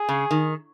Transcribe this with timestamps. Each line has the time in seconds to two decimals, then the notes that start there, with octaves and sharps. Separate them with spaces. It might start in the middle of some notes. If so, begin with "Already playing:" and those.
Already playing: G#4
0.09 C#3
0.31 D#3